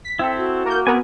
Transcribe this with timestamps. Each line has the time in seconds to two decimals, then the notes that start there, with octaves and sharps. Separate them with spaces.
0.05 B6
0.19 C4 E4 A4 G5
0.36 F#4
0.65 A#3 A#4 G6
0.87 B3 C4 A#4 G#5